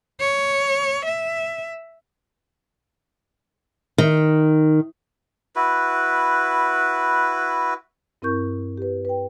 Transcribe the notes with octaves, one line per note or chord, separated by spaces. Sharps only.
C#5
E5
D#3
E4 F#4 B4
G2 C4 E4 A#4 C#6 G6
G4 B4
B4 G5